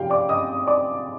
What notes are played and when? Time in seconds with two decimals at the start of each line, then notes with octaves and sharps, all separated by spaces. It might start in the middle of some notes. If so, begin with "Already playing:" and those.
Already playing: C3 F3 G4 F5 G5
0.10 D5 D6
0.29 D#5 D#6
0.67 D5 D6